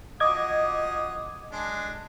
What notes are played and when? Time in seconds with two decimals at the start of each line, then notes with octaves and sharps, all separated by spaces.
0.20 F3 F#4 D#5 D6 D#6 G#6
1.52 G#3 D4